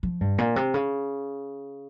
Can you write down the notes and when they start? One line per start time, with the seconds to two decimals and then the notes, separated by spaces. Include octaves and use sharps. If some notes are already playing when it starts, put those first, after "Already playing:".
0.03 F3
0.21 G2
0.38 A#2
0.56 C3
0.74 C#3